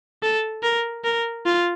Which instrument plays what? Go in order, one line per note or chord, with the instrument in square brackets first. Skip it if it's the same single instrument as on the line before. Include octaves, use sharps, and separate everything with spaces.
[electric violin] A4
A#4
A#4
F4